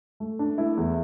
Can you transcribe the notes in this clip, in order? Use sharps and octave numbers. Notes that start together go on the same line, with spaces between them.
A3
D4
A3 E4
E2